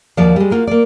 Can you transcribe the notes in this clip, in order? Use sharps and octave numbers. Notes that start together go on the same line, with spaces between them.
D#2 F3 F#4 D5 F5
G3 G#3
A#3 F4 F#4
A#3 D5